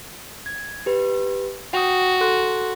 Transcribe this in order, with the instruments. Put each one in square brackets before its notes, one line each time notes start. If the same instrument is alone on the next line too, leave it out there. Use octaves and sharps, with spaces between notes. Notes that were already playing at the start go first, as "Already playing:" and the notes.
[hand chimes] G#6
G4 B4
[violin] F#4 [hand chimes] G5 D#6
[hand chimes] A4 C6 F#6